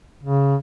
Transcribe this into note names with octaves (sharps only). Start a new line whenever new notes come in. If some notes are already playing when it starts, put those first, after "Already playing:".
C#3